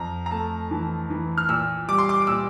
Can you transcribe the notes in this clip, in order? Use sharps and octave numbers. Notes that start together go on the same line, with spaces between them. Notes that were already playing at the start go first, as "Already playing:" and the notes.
Already playing: F2 A#5
A#5
A3 A5
E3
E3
F6
A#2 E6
G3 D6
C6
D6
D6
A#2 E6